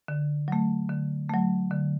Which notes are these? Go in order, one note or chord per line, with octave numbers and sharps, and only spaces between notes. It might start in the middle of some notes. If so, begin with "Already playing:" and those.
D3
F#3 A3
D3
F#3 A3
D3